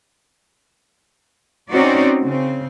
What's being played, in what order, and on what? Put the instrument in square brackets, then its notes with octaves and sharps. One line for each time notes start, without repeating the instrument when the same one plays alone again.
[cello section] C4 C#4 D#4 F#4 D5
C#3 C4